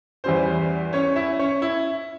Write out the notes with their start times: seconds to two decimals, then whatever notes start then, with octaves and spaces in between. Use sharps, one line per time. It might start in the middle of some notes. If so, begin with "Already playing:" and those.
0.24 E2 E3 G3 C#4 C5
0.93 C#4 C#5
1.16 E4 E5
1.39 C#4 C#5
1.62 E4 E5